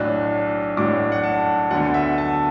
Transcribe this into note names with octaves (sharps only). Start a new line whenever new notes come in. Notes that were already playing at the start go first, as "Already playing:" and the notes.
Already playing: B1 A2 F#3 D4 F#6
B1 A2 F#3 D4 D6
F#5
A5
D2 D3 B3 F#5
E5
A5